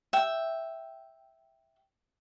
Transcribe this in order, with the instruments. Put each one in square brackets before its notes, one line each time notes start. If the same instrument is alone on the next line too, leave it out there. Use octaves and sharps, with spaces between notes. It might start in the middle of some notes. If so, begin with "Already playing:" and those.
[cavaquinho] E5 G5